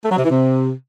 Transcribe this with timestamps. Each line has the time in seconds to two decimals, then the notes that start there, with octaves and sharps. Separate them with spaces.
0.04 A3
0.10 F#3
0.17 C3
0.24 E3
0.30 C3